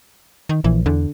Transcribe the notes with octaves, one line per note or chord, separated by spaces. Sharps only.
D#3
A#1 E3
E2 D3